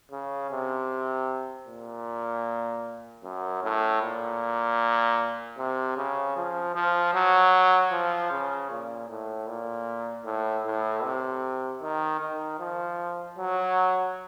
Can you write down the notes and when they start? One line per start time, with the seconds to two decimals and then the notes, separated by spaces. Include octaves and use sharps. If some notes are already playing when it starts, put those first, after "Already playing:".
0.11 C#3
0.51 C3
1.67 A#2
3.24 F#2
3.63 A2
4.02 A#2
5.58 C3
5.97 C#3
6.36 F3
6.75 F3
7.14 F#3
7.92 F3
8.31 C#3
8.70 A#2
9.09 A2
9.47 A#2
10.25 A2
10.65 A2
11.03 C3
11.82 D#3
12.20 D#3
12.59 F3
13.38 F#3